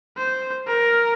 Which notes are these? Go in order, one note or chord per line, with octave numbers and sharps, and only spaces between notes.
C5
A#4